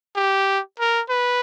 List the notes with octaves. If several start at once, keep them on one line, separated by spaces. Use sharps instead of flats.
G4
A#4
B4